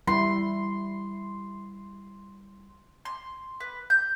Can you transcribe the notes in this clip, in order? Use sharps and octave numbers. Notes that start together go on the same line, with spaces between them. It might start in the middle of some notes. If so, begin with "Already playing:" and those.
G3 E4 C6
C6
B4
G6